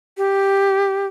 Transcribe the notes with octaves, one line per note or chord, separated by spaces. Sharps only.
G4